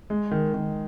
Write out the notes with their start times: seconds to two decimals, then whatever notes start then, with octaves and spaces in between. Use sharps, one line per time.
0.10 G#3
0.31 D#3
0.54 D#3